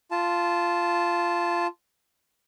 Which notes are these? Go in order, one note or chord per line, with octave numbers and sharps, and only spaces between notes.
F4 A5